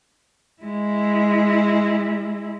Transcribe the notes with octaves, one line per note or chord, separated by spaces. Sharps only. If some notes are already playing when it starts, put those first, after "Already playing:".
G#3 E4